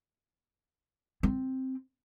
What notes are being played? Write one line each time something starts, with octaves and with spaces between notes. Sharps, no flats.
C4